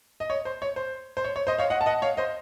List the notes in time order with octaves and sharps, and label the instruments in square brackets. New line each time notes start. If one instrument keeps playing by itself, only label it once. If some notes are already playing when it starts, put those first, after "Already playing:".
[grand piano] D#5
C#5
C5
C#5
C5
C5
C#5
C#5
C5 D#5
C#5 F5
D#5 F#5
A5
D#5 F#5
C#5 F5
C5 D#5